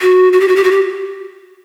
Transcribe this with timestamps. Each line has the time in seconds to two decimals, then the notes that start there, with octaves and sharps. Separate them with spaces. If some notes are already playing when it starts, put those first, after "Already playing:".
0.01 F#4
0.33 F#4
0.41 G4
0.48 F#4
0.56 G4
0.64 F#4
0.71 G4